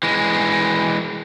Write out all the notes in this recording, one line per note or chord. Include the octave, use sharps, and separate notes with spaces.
E3 G#3